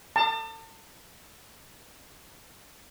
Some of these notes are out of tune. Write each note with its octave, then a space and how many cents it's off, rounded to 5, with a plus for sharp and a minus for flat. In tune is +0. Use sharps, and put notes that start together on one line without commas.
A5 +35